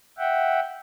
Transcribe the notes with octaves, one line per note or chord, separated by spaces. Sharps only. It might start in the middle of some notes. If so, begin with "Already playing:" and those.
E5 F#5 G5